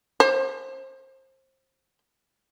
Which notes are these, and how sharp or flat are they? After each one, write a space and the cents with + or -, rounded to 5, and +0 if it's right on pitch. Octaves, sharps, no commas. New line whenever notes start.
C5 +25